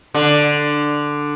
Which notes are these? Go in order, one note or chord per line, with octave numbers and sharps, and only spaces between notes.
D3